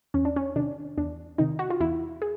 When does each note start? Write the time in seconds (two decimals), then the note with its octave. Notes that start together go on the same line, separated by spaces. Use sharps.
0.14 E2 C#4
0.25 D4
0.36 C#4
0.56 C3 D#3 D4
0.97 E2 D4
1.38 C3 D#3 D#4
1.59 F#4
1.70 F4
1.80 E2 E4
2.22 G#4